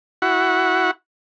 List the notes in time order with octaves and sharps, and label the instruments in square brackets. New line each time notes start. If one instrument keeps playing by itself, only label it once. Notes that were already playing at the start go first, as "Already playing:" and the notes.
[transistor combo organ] E4 F#4 F#5